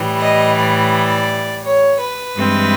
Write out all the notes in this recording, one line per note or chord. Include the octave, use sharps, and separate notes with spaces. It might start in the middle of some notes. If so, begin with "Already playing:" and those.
Already playing: A2 E3 G3
D#5
D5
C#5
B4
G2 E3 G#3 C4